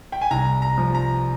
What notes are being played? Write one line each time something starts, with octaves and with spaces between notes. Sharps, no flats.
G5
G#5
C2 A#5
A#5
F3
A#5